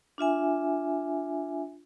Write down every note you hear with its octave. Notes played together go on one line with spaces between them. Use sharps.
D4 F4 E5 G#5